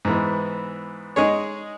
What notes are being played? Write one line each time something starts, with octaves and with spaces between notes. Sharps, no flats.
G#2 E3 B3
G#3 D#4 G#4 C#5